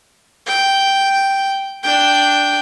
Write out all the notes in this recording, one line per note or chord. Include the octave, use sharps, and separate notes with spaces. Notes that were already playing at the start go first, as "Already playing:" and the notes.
G5
D4 G5